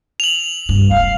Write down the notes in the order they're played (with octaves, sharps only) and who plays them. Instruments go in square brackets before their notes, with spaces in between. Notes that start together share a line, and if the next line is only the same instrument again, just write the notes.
[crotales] F7 F#7
[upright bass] G2
[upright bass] E1 [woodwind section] F5